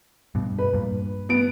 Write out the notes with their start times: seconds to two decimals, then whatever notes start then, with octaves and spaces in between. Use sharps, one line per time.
0.35 G2 B2
0.58 B4
0.74 G2 A#2
1.29 B3 D7